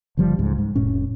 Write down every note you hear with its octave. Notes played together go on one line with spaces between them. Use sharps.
F#1 D3 F3 G3
C#2 G#2
G#2
F1 A2 C#4